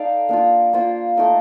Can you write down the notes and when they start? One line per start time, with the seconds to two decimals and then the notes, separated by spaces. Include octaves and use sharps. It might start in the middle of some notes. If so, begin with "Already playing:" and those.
Already playing: D#4 A4 D5 F5
0.29 A#3 D4 F4
0.73 A#3 F4 C5
1.17 A3 D#4 A#4 D#5